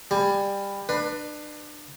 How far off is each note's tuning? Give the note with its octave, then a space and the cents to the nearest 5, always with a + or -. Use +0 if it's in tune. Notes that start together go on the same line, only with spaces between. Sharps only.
G3 +20 G#5 +35
D4 +30 B4 +0